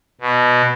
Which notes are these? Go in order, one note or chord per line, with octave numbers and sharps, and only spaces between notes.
B2